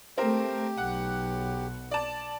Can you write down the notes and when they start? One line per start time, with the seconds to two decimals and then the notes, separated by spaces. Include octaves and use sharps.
0.18 A3 C4 G4 A#4 C5
0.77 B1 F#5
1.91 D5 A5